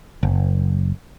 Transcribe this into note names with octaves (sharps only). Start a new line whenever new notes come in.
F#1